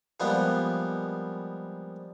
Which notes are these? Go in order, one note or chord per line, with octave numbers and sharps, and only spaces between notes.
F3 G3 G#3 A#3 B3 F4